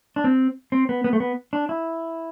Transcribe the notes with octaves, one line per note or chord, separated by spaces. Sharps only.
D4
C4
C4
B3
B3
A3
B3
D4
E4